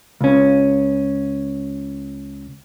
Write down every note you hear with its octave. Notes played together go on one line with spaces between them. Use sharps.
C#2 C#4